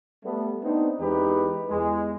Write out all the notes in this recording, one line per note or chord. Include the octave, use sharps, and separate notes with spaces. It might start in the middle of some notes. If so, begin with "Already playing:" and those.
G3 A3 B3
B3 C4 D4 D#4
E2 E3 G#3 D#4 G4 B4
E2 G#3